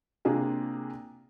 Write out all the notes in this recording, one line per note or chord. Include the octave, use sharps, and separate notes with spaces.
C3 A#3 D4 F4 G#4